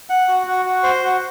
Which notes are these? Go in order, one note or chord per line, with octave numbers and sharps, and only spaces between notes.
F#5
F#4
F#4
F#4
C5
F#4